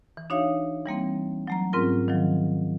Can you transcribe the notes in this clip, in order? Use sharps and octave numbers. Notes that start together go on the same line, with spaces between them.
E3
D4 D#4 F#4 C#5 E5 F5
E3 G3 A#3 C4
F#3 A3 A#5
G#2 C4 C#4 F4 A#4
D#3 F3 F#3